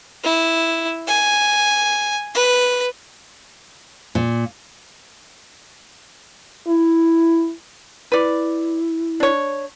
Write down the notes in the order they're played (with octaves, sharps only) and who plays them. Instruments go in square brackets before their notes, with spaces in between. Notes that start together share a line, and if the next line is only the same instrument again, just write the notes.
[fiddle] E4
G#5
B4
[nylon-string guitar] A#2
[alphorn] E4
[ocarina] E4 [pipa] B4 D5
[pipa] D4 C#5